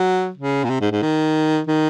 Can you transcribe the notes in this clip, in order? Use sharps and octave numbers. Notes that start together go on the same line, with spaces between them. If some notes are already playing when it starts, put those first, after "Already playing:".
Already playing: F#3
C#3
A#2
C3
G#2
G#2
D#3
D#3